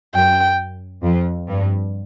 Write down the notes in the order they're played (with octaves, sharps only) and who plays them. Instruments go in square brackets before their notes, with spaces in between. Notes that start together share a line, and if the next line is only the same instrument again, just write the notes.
[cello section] F#2 [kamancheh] G5
[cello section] F2
G2